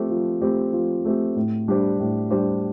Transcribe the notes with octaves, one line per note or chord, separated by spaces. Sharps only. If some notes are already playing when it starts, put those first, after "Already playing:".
Already playing: F3 A3 C4 G4
F3
A3 C4 G4
F3
A3 C4 G4
A2
G3 D4 G4 C5
A2
G3 D4 G4 C5